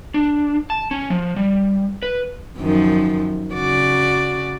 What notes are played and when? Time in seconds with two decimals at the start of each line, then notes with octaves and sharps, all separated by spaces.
0.14 D4
0.70 A5
0.91 C#4
1.10 F3
1.36 G3
2.03 B4
2.58 F#2 D#3 F3
3.54 C#3 F#4 D5